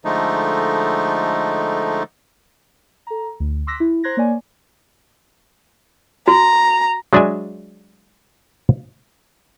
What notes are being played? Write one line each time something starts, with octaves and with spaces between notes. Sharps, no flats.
D3 F3 G#3 A3 D#4
A4 A#5
D2
C6 D6 E6 F#6 A#6 B6
E4
C5 A#5 C6 F#6 G#6 A#6
A#3 C#5 D5 G#5
F#4 A#5
F#3 G#3 D4 D5 E5 G#5